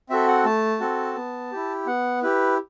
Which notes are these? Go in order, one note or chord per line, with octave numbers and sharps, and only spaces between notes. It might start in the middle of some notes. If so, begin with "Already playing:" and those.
C4 F#4 A4 E5
F#5
A3 A5
C4 F#4 A4
B3
E4 G4
B3 F#5
E4 G4 B4